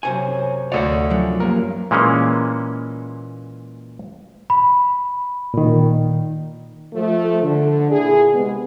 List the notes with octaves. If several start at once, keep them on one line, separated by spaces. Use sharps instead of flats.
F#2 C3 C5 G#5 C#6
D2 F#4 C#5 D5 F#5
F#2 F3 F#3
G2 A#3 A#4
A#2 E3 G#3 A#3 C#4
B5
A#2 D#3
F3 A3
D3
A#2 E4 G#4
C3 G#3 B3